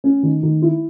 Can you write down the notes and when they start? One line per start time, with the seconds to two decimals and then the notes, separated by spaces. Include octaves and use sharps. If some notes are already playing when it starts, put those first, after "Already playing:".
0.04 C#4
0.23 D#3
0.43 D#3
0.62 E4